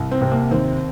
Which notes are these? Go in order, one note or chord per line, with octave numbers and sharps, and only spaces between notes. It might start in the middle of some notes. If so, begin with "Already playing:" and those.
Already playing: C2
C4
C3
A#3
D#2 C4